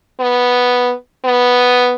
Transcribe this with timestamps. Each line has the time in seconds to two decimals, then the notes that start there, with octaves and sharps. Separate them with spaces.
0.20 B3
1.25 B3